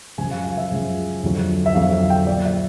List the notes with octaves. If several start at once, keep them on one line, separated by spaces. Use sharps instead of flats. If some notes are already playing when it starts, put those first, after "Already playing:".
F#2 C#3 F3 G#3 G#5
F5
F5
E5
F#2 C#3 F3 G#3
F2 D3 F#3
E5
F2 D3 F#3 F5
F5
G5
A#2 F#3 D5
E5